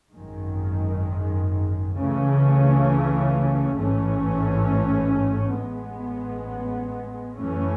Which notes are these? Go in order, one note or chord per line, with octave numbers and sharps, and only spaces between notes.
G#1 F#2 D#3 G#3
C#2 C#3 E3 A3 C#4
A1 G#2 E3 A3 C#4
A1 A2 G#3 B3
F#2 E3 A3 C#4